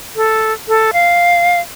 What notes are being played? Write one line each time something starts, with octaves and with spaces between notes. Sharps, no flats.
A4
A4
F5